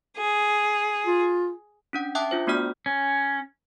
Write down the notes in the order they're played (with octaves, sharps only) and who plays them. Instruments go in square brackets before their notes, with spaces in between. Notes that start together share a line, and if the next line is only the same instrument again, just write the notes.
[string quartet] G#4
[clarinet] F4
[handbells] C#4 D4 F#5
E5 G5 A5 D6 D#6 F#6
D4 F4 C5
A3 B3 D4 F#4 D5 F6
[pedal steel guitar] C#4